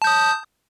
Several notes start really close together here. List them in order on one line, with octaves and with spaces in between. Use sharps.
A5 G6 D#6